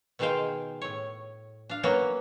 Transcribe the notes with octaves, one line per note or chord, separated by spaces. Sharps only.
B2 D#3 G#3 C5 F5 G5
A2 C#5
D4 F5
F#3 A#3 B3 C#4 F#4